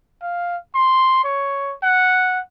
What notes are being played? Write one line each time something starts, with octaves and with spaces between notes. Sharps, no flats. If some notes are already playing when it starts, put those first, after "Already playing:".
F5
C6
C#5
F#5